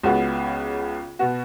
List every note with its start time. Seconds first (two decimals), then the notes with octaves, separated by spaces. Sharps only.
0.03 C#2 C#3 B3 F#4
1.19 B2 B3 F#4